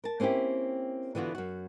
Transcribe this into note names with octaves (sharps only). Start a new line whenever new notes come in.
A#4 A5
A#3 C4 C#4 E4 G4
D3 E3 B3 F4 F#4
F#2 F#4